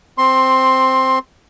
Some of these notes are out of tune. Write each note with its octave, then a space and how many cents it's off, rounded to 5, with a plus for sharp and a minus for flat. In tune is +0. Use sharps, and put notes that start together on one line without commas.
C4 +0 C6 +10